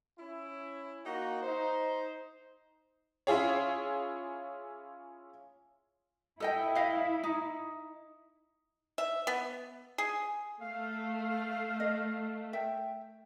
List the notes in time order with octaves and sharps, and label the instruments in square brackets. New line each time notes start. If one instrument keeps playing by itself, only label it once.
[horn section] C#4 E4
A#3 D#4 F#4
D#4 C5
[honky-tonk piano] C#4 E4 F4 G#4 C#5
[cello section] E4 [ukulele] A4 D#5 G5
[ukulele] D#5 F5
D#4
[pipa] E5
B3
G#4
[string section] A3 [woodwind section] F5
[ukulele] D#5
E5 G5